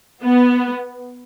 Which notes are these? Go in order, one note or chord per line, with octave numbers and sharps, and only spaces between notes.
B3